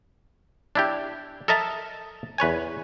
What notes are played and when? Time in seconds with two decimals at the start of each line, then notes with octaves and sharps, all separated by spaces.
0.75 D4 E4 G4
1.48 A4 A#4 D#5 E5 A5 A#5
2.38 E2 B4 C#5 G#5